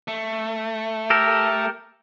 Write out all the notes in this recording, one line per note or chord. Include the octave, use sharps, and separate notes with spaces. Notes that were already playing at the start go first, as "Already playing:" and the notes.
A3
G4 A4 A#4